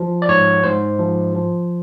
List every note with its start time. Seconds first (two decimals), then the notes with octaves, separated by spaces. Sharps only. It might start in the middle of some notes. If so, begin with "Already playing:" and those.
Already playing: F3
0.22 D5
0.29 G#2 C#5
0.63 G#2 C5
0.99 F3
1.34 F3